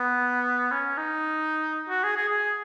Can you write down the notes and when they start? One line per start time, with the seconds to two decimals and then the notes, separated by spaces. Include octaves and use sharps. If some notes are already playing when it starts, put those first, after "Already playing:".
Already playing: B3
0.71 C#4
0.97 D#4
1.89 F#4
2.04 G#4
2.17 G#4
2.29 G#4